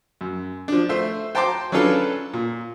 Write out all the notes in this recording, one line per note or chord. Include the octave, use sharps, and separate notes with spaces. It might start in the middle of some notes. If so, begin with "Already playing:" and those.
F#2
F3 D4
A3 C5 E5
C5 G5 A5 A#5 C6 D6
F#3 C#4 D4 F4 A4 B4
A#2